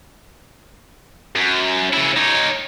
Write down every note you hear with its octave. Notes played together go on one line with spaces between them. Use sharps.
F#2
C#3 E4
D#4 C#5